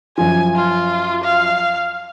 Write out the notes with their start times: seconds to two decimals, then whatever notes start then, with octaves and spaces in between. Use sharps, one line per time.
0.18 F#2 F3 G#5
0.56 F4
1.24 F5